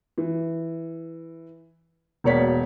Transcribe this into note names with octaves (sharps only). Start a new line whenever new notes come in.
E3
E1 B2 A#3 C#5 D5 B6